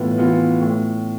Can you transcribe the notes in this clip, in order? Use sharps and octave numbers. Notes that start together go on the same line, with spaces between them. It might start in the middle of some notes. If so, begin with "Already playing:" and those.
Already playing: A2 E3 B3 F4
E3 B3 F4
A2